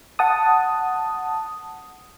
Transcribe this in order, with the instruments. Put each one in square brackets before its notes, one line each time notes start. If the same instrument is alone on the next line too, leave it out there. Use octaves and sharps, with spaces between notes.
[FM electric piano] F#5 A5 D#6